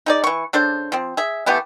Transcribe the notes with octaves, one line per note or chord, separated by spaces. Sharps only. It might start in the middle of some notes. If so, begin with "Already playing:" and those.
D#4 G#4 D5
E3 C#6
C#3 D4 A4 C5
F3 C4
G#4 E5
E3 A3 B3 G4